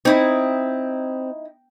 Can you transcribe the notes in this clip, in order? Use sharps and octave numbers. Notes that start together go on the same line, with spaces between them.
C4 D#4 E4